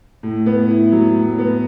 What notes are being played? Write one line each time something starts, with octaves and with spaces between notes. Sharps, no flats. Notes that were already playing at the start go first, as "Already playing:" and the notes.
A2
B3
E4
F#3
A2
B3